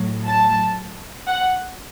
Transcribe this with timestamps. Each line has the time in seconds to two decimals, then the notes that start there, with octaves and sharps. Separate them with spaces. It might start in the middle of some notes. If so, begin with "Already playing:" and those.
Already playing: A2 F#3
0.28 A5
1.29 F#5